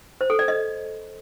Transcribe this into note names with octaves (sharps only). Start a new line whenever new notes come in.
C5
A4
D5
D#5